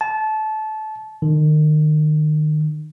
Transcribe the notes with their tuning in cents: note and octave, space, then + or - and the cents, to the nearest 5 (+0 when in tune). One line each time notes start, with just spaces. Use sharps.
A5 -20
D#3 -30